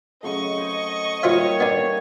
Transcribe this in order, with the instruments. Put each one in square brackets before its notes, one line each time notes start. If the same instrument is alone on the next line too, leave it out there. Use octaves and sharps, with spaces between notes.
[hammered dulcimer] C#3 F#3 A3 [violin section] D#5 C#6
[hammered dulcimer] C5 C#5
[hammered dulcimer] G3 A#3 D#4 [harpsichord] F4 C5 E5 [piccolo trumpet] C#5
[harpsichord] B3 D4